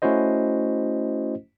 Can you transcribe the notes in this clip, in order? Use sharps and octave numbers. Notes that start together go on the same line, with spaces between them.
A3 C#4 E4 F#4 C5 D#5